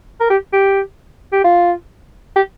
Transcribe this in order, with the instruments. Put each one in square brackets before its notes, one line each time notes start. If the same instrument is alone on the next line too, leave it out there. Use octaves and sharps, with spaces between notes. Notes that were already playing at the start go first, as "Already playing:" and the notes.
[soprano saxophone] A#4
G4
G4
G4
F4
G4